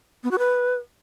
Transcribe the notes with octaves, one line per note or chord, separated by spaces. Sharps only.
B3
F#4
B4